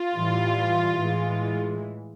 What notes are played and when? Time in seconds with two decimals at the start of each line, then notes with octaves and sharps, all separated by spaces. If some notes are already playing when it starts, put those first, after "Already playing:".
Already playing: F4
0.15 A2 E3 G3
0.96 A2 E3 G#3